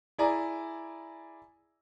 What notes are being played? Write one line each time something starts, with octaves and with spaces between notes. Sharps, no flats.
E4 G#4 D5 G#5 A#5